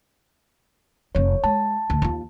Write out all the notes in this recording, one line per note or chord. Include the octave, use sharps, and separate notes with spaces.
F1 F2 C#5
G#3 A5
D2
D#2 F4